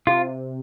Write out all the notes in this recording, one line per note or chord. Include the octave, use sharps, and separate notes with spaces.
C3 F4